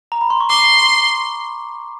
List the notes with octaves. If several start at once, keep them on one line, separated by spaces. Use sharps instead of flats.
A#5
B5
C6
C#6
C6 D6